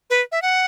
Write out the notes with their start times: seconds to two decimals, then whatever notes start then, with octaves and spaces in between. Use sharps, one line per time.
0.10 B4
0.32 E5
0.42 F#5